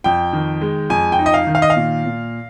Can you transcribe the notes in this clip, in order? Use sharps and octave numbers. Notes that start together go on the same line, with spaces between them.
F2 G5
D#3
G#3
F2 G#5
G5
D#4
D#5
F5
D#3
F5
D#5
F5
A#2
A#2